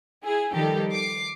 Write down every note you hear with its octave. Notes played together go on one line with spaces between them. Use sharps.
E4 G#4
D#3 F3 G3 D#4 G4 A4
D6 C7